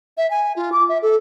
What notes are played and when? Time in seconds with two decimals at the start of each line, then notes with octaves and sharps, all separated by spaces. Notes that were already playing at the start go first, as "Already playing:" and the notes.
0.18 E5
0.31 G#5
0.56 F4
0.72 D6
0.89 E5
1.02 A4